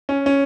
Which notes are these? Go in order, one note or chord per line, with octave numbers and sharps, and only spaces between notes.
C#4
C#4